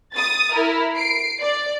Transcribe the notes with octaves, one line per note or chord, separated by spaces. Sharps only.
D#6 A6
E4 A#4
C7 D7
D5